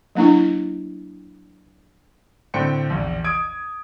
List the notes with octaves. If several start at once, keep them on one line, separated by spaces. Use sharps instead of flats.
F#3 A#3 D4 E4
A2 D3 C4 G5 C#7
A#1 E2
D#6 G#6 D7